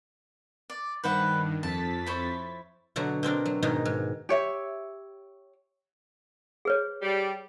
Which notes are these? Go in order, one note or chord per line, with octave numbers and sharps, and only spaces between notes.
D5
G2 D#3 B4 C5 F#5
F2 A5 A6 B6
E4 C5 C#5
B2 D3 F#3 F#4
B2 C4 D4 A#4
F#3
G#2 B2 D#3 D#4
G#2
G4 C#5 E5
G#4 B4 C#5
G3